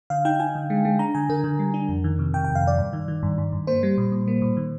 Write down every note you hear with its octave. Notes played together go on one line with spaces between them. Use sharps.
D3 F5
D#4 G5
D#4 G#5
D3
G#3
G#3
D4 A#5
D3 G#5
D3 A#4
D3
G3
D4
F2
D#3
C3
C3 G5
F2 G5
F5
F2 D5
G2
D#3
D#3
G2
G2
G2
A#3 C5
G3
A#2
A#2
A#3
A#2
D#3